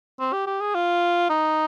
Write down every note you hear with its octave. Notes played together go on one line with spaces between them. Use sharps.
C4
G4
G4
G#4
F4
D#4